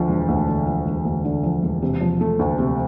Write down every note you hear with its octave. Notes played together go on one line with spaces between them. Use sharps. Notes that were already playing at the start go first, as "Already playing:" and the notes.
Already playing: D2 D3 F3
E1
D2
D3
F3
E1
D2
D3
F3
E1
C3
F3
A3
D2
C3